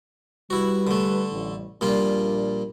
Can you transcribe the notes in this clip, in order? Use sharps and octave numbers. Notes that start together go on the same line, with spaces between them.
G3 E4 F#4 B4
D3 A3
A1 G3
A#1 A#2 G3 D4 F4